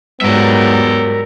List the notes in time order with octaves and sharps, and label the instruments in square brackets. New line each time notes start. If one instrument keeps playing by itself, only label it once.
[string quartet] G#2 F#3 G3 [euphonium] B3 [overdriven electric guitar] A#4 E5